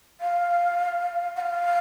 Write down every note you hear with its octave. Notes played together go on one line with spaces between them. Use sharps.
F5
F#5
F5